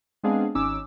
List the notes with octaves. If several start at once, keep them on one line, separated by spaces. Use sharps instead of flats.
G#3 B3 C4 D4 G#4 F5
G#1 C#4 D#4 D6 E6